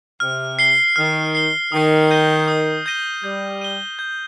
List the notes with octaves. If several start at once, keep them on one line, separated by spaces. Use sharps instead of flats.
C3 F6
C7 G7
D#3 F6
C7 G7
D#3 D#6
G6 A#6 D#7 G7
D#6
G6 A#6 D#7 G7
G3 G6
D#7 G7
G6